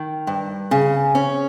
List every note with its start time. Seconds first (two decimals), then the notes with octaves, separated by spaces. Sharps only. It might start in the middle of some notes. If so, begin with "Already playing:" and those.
Already playing: D#3
0.27 G2
0.71 C#3
1.15 C#4